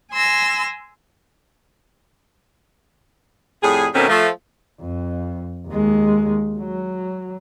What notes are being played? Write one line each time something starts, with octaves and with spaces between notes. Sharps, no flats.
G#5 C6 E6 A#6
F2 A2 G3 G#4
B2 D#3 A3 A#3 C4 C#4
F3 A3
F2
D#2 G#3
F#3